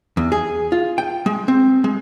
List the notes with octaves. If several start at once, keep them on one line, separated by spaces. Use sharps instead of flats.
E2
G#4
F4
G5
G#3
C4
G#3